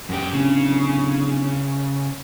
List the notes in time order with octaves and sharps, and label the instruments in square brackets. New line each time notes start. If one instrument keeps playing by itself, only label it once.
[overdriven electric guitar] F#2 G4
[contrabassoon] D1 [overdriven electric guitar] C#3